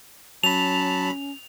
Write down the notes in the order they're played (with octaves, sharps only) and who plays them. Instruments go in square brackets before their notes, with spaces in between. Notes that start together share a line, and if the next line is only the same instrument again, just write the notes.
[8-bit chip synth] F#3 B5 [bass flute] C#4 [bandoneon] A5 [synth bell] F7